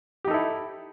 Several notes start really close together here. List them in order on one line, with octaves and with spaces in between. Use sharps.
G4 D#4 A4 E4